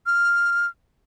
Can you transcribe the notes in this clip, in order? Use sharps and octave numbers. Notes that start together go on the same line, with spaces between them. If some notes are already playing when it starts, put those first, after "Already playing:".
F6